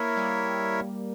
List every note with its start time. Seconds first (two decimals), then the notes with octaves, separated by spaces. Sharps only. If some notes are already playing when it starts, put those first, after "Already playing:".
Already playing: A#3 E4 A#4 C#5 E5
0.16 G3